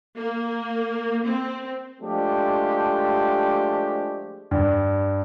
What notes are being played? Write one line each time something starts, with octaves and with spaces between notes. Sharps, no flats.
A#3
C4
F3 G#3 A3 D4 G4
G2